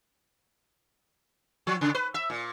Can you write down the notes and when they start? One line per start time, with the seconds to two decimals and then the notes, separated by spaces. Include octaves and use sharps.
1.67 F3
1.81 C#3
1.95 B4
2.14 E5
2.30 A#2